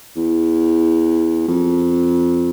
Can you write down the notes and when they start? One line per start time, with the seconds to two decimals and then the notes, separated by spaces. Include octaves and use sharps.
0.16 E2
1.48 F2